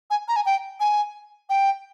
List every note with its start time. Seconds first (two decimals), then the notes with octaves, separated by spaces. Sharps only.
0.10 G#5
0.28 A#5
0.36 G#5
0.46 G5
0.80 G#5
1.49 G5